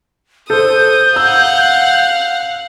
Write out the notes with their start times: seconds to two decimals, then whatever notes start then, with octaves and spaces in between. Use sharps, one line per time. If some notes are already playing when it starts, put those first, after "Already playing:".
0.50 A4 C5 D#6 G6
1.16 F5 F#5 E6